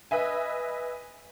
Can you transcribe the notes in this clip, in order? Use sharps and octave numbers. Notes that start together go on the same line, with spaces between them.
B4 D#5 E5 G#5